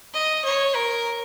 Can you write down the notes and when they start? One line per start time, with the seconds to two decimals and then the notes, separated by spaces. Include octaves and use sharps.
0.14 D#5
0.45 C#5
0.75 A#4